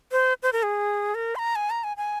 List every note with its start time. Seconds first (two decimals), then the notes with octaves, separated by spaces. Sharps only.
0.12 C5
0.43 C5
0.53 A#4
0.63 G#4
1.15 A#4
1.35 C6
1.39 A#5
1.56 G#5
1.70 A#5
1.84 G#5
1.97 G#5